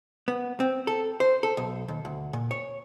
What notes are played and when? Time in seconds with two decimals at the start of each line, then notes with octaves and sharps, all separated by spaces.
0.28 B3
0.60 C4
0.87 A4
1.20 C5
1.43 A4
1.57 B1
1.88 D#2
2.05 D2
2.33 A#2
2.51 C#5